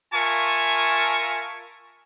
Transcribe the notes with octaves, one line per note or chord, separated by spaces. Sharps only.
F4 A#4 E5 G#5 A5 C#6